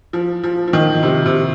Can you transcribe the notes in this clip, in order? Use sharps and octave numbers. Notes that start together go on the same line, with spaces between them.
F3
F3
F3
D#3
C3
C3